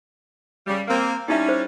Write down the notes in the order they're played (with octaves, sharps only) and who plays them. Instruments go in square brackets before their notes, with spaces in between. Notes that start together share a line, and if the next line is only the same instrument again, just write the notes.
[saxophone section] C#3 G3
A#3 C4
[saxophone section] G3 C#4 [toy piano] D#4 E4 E5
[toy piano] C5